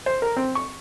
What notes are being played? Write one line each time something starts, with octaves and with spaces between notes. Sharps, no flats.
C5
A#4
C4
C#6